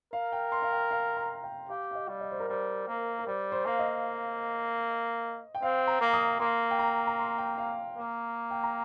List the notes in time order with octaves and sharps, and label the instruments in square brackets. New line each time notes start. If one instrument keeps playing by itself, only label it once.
[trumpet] A#4 [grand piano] F5
[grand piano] G5
C6
F5
G5
F5
A#5
G5
[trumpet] G4 [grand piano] F5
[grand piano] F5
D#5
[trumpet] G3
[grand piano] D#5
C5
A#4
[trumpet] G3 [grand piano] C5
[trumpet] A#3
[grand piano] A#4
[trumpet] G3 [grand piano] C5
[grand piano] C5
[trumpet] A#3 [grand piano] F5
[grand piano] D#5
G5
[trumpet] C4 [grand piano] F5
[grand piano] A#5
[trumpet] A#3
[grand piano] D#6
[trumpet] A#3 [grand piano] C6
[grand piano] G5
A#5
A#5
C6
G5
F5
[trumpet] A#3
[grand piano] G5
A#5